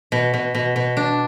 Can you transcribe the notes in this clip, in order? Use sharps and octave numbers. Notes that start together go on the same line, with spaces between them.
B2
B2
B2
B2
D4